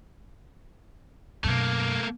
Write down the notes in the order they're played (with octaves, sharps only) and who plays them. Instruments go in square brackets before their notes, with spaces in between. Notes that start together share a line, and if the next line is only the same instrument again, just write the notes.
[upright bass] F#2 B2 [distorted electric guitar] A3 A#3